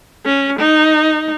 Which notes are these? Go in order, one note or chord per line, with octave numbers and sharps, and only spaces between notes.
C#4
D#4